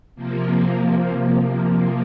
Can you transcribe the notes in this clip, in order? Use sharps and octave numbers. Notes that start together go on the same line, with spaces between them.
C3 F3 A#3